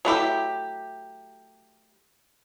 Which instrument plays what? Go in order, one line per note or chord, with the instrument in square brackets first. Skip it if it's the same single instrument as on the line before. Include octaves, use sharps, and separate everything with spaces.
[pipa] F#3 A3 E4 G4